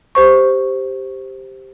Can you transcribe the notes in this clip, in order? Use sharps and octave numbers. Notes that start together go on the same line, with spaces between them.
G4 C5 C#6